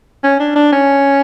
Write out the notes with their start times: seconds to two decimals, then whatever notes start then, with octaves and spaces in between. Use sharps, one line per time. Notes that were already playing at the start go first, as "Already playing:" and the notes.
0.24 C#4
0.39 D4
0.56 D4
0.72 C#4